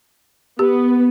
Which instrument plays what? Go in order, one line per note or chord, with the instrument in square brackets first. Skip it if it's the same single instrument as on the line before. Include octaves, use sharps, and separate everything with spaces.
[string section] B3 [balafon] G4